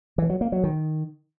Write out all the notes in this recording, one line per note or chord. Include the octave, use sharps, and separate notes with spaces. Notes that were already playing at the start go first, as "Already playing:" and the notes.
E3
F#3
A#3
F#3
D#3